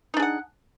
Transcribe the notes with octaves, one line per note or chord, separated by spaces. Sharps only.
D4 D#4 G#4 F#5